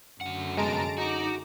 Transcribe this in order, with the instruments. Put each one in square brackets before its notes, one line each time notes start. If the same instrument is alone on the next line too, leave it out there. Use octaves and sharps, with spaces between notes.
[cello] F#2 D3 [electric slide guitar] A3 F#5
[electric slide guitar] F2 C3 B3 [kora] G#3 [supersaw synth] A5 A#5 D7
[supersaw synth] D#4 A#5 D6 [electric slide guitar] F#4